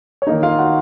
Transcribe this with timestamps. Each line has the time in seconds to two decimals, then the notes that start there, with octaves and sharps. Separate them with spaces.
0.22 C#5
0.27 D#3 A#3 D#4 D#5
0.43 F4 F5
0.59 F#4 F#5